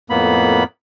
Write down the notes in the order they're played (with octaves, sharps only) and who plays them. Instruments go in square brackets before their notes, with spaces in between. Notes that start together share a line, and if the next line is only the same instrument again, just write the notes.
[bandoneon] F2 A2 A#3 B3 B5